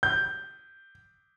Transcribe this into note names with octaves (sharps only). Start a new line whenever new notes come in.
G6